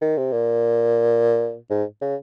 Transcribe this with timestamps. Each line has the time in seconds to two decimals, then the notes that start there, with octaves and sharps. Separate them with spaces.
0.01 D#3
0.17 C3
0.32 A#2
1.70 G#2
2.01 C#3